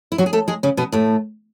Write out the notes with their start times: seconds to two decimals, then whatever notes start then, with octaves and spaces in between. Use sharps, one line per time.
0.12 E4
0.18 F#3 F#4
0.26 G#4
0.33 A3 A4
0.48 G#3 G#4
0.63 C#3 C#4
0.77 B2 B3
0.92 A2 A3